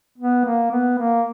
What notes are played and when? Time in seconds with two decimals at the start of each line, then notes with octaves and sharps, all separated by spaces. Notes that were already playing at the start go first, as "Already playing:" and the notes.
0.18 B3
0.45 A#3
0.72 B3
0.99 A#3